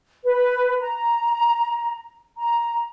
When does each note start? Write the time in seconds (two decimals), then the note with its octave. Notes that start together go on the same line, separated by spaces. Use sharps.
0.25 B4
0.81 A#5
2.38 A#5